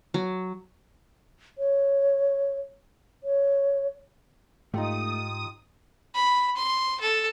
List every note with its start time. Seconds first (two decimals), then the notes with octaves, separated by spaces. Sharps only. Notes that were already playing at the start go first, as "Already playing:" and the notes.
0.14 F#3
1.58 C#5
3.24 C#5
4.74 G#2 A3 D#4 F4 G4 D#6
6.14 B5
6.56 C6
7.00 A4